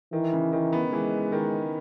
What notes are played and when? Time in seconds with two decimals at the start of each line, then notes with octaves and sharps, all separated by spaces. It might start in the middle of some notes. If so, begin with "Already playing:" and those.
0.13 D#3 E3
0.33 C#3
0.52 D#3
0.73 B3
0.92 E3 G#3
1.32 D#3